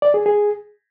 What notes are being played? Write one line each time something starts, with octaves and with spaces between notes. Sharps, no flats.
D5
G#4
G#4